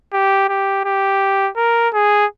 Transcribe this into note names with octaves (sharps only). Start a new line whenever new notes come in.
G4
G4
G4
A#4
G#4